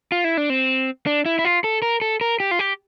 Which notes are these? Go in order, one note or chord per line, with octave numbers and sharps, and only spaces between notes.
F4
E4
D4
C4
D4
E4
E4
F4
A4
A#4
A4
A#4
G4
F4
G4